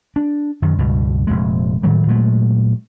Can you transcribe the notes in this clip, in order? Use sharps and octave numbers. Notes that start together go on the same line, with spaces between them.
D4
F#2 D#3
C#2 G2 B2
F1 F2 A#2 G#3
A2 D#3 F#3 G3
A#2 F#3 G#3 A3